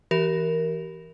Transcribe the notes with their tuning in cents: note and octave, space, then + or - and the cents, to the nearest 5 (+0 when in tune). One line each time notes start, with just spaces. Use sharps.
E3 +0 G4 -35 A#4 +0